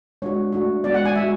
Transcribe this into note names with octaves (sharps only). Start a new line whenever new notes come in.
G#3 D4 F#4 C#5
A3 D4 F#4
G#3 B3 D4 F#4 D5
F#5
G#5
G#3 D4 F#4 E5